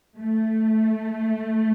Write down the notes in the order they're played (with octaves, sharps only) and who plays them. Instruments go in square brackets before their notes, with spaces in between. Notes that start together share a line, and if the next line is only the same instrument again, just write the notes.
[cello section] A3